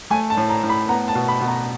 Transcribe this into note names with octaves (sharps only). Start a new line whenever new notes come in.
A3 G#5
A5
A2
A#5
A2
B5
B3 A#5
A5
B2
B5
B2
A#5